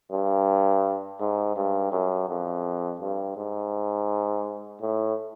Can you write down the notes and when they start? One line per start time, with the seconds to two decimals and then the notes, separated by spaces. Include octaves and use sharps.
0.11 G2
1.20 G#2
1.56 G2
1.92 F#2
2.29 F2
3.01 G2
3.37 G#2
4.81 A2